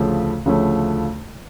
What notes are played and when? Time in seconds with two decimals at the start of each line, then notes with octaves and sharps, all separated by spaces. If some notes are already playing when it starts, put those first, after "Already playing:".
Already playing: D2 C#3 F3 A3
0.45 D2 C#3 F3 A3